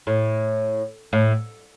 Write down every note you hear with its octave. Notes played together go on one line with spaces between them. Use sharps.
A2
A2